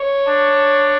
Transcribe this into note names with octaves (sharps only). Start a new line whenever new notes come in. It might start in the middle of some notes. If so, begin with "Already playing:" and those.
Already playing: C#5
D4